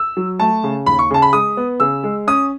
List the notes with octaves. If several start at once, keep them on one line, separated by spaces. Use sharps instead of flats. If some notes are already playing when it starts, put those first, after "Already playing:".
Already playing: E6
F#3
A3 A5
C#3
D#2 B5
C#6
C#3 A5
B5
G#3 D#6
B3
C#3 E6
G#3
C#4 D#6